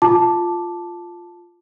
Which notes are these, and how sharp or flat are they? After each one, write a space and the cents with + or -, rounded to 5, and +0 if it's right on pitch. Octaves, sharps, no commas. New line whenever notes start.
F4 +0 A5 +0 D6 +0